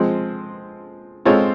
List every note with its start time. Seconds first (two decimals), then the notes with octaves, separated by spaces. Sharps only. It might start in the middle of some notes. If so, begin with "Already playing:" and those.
Already playing: F3 G#3 C4
1.25 G#3 C4 F4 A4 C#5